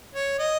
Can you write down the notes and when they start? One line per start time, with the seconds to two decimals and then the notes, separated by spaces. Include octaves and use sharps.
0.15 C#5
0.39 D#5